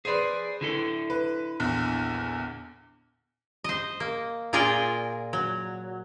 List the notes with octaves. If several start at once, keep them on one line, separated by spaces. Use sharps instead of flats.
G#4 B4 C5 D5
D3 E4 A4
B4
A#1 E2
C5 D#5
A#3
A#2 F4 G#4 A#4 D5 G5
F#3